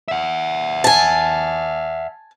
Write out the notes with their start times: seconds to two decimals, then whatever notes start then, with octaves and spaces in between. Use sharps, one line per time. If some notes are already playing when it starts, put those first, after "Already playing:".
0.08 E5 F#5
0.84 G#5 A5